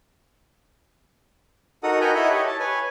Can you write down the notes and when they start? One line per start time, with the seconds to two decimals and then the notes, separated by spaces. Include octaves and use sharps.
1.83 D#4 F#4 A4 A#4 F#5 D#6
2.01 F#4 A#4 B4 D#5 G5 G#5
2.15 E4 A4 D#5 E5 F#5 B5
2.30 G4 C#5 D#5
2.47 A5
2.60 B4 C#5 G#5